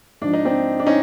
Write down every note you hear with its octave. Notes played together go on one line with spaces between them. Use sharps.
G#2 F3 D4
D#4
C4 D4
D4
C#4 D#4